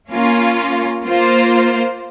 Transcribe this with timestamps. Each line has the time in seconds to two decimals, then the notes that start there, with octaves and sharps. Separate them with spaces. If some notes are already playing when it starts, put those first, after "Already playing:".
0.11 A#3 C#4 F4
1.04 A#3 F4 C5